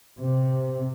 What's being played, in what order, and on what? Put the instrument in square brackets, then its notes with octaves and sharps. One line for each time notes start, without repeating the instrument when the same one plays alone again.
[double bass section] C3